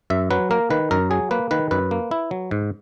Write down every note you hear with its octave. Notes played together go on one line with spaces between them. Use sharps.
F#2 E5
F#3 B4
A#3 A#4
D#3 B4
F#2 A#4
F#3 G#4
A#3 B4
D#3 B4
F#2 B4
A#3
E4
F#3
G#2